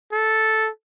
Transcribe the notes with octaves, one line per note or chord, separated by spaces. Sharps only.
A4